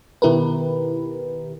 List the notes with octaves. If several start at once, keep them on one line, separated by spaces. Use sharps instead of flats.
B2 D#3 E4 G4 A#4 B4